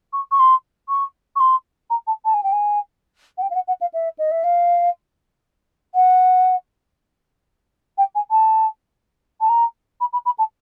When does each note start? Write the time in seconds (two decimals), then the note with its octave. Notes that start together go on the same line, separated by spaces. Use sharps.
0.13 C#6
0.32 C#6
0.39 C6
0.89 C#6
1.36 C#6
1.40 C6
1.90 A#5
2.07 A5
2.25 A5
2.34 G#5
2.43 G5
2.52 G#5
3.38 F#5
3.42 G5
3.50 F5
3.55 F#5
3.68 F#5
3.81 F5
3.94 E5
4.19 D#5
4.31 E5
4.44 F5
5.95 F#5
7.98 G5
8.15 G#5
8.31 A5
9.41 A5
9.49 A#5
10.01 B5
10.13 B5
10.26 B5
10.39 A5